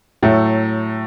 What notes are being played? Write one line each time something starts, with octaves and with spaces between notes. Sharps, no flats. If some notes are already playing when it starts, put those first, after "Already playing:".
A2 F#3 A3